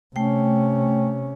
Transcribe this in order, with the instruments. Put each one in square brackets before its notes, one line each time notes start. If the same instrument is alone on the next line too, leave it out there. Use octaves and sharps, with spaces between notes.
[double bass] C3 C#4 [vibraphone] A3 G5